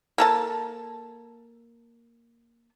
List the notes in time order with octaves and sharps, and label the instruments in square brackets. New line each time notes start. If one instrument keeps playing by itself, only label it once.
[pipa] A#3 A4 A5